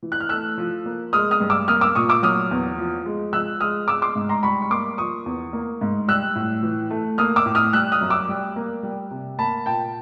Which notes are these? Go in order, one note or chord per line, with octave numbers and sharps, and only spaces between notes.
E3
F#6
F6
A3 E6 F#6
F3
A#3
G#3 D#6 F6
D#6 F6
G2
D6 E6
A#3 D#6 F6
D6 E6
A#2 C#6 D#6
D6 E6
F#3 D#6 F6
E2
F3
G#3
F3 E6 F#6
G#3 D#6 F6
G#3 D6 E6
C6 D6
G#2
A#5 C6
G3 B5 C#6
C#6
A#3 C6 D6
F3 C#6 D#6
E2
A#3
G#2
G3 E6 F#6
A2
E3
A3
A#3 D#6 F6
D6 E6
A2
D#6 F6
G3 E6 F#6
D#6 F6
F#2
D6 E6
G3
A#3
G3
C3
A#3 A5 B5
A#2 G5 A5